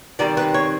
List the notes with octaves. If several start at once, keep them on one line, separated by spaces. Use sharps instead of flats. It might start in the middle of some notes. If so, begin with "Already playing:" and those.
D#3 G3 C4 D5
B4
C#5